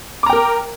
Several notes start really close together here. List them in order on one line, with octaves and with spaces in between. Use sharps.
D6 A#5 G5 A#4